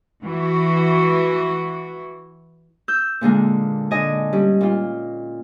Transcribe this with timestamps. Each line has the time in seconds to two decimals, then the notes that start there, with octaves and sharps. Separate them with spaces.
0.22 E3 F#4
2.88 E6 G6
3.21 A#2 D3 G#3 A#3
3.91 D3 D5 D#5 G#5
4.33 G3 C#4
4.61 A#2 F4